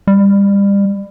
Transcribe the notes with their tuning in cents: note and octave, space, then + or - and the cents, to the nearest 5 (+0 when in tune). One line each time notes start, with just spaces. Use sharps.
G3 +30